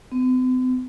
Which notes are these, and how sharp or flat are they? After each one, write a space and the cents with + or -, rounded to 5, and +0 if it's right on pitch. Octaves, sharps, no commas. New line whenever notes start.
C4 -45